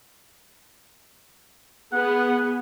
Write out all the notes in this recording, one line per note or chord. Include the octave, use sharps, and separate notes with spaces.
B3 G#4 F#5